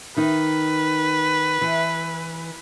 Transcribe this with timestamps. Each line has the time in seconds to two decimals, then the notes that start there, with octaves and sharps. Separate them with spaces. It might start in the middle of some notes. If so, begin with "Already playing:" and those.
0.17 D#3 D#4 B4
1.61 E3